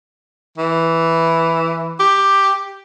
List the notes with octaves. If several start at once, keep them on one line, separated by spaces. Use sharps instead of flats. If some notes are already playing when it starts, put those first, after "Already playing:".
E3
G4